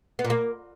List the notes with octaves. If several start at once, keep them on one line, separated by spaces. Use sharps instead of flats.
B3
A#2
A#3